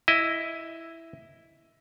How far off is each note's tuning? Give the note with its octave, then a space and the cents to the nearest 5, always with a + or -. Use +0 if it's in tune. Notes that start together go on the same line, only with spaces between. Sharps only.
E4 +0 D#5 +15